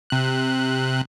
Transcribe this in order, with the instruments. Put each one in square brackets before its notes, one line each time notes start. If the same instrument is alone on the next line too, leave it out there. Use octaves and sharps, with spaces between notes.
[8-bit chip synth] C3 F#6